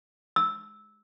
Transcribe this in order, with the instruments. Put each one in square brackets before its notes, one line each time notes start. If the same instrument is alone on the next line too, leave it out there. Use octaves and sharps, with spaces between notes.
[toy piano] E6